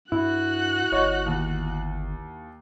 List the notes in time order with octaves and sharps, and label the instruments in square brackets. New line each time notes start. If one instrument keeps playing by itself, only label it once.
[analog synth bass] G2 [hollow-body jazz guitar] E4 [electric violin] F#4 F#6
[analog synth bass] G1 [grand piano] C#5 D#5 C#6
[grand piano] D#2